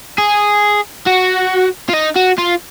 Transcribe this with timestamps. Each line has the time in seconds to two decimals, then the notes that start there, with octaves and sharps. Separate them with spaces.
0.18 G#4
1.07 F#4
1.89 F4
1.94 D#4
2.16 F#4
2.38 F4